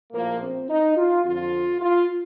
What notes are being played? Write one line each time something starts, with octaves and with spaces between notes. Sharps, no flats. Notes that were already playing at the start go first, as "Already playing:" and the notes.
A#1 A2 F3 A#3
C4
D#4
F4
F2 D3 F3 F4
F4